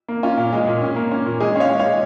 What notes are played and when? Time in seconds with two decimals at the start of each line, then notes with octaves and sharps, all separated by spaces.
0.08 A#3
0.23 C#4 F4
0.37 A#2
0.53 G#3
0.67 A#2
0.82 C#4
0.96 A#3
1.12 C#4
1.26 A#2
1.40 G#3 G#4
1.56 C#4 C#5 F5
1.70 G#3
1.79 C#5 F5
1.85 G#3